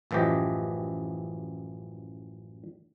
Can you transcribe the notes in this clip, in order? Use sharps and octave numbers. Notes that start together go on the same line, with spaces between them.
A1 F#2 E3 F3 G4 D#5